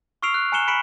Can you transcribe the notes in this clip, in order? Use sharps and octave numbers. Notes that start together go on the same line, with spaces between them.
C#6 E6 F6 C7 D7 F7
F#6
G#5 A#5 F#6 C#7 E7 G7
B5 B6 C#7 D7 E7 F#7